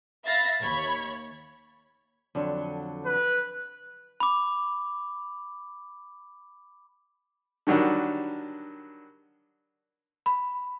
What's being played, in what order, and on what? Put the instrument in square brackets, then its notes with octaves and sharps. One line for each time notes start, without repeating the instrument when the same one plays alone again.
[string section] E5 F5 B5 A6 A#6
D#2 C#5 B5 G#6
[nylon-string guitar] F2 D3 F#3
[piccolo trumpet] B4
[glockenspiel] B5 D6
[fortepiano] D3 D#3 F#3 G3 D4
[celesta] B5